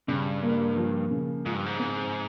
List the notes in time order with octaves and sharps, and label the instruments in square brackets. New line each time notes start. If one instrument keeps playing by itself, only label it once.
[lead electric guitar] G2 [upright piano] C#3
[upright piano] A#3
F3
C#3
[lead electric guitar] G#2 [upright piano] F4
[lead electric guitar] G2
G#2
[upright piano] C4